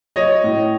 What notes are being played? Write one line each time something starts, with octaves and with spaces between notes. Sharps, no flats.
F#3 C#5 D#5
A2